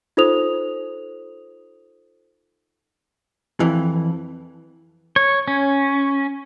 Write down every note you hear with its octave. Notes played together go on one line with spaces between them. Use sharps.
D#4 F4 A4 C5 D#6 F7
F2 E3
C#5
C#4